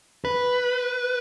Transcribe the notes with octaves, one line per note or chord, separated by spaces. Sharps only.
B4